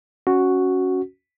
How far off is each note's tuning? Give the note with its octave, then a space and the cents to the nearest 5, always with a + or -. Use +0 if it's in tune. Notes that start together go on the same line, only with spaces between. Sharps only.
C#4 +0 F#4 +0